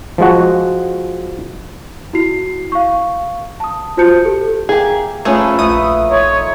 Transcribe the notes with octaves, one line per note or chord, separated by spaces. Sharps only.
F3 G#3 F#4
E4 F#4 C7
F5 C#6
A5 D#6
F4 F#4 C5 A5 G6 C#7
G4 A4
A#3 G4 G#4 E6
F3 A3 C#4 G#4 B4
A#1 A3 E4 D#6
D#4 C#5 E5 C6